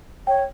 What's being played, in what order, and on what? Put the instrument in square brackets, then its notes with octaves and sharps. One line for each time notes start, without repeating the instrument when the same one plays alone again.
[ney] C#5 [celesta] G5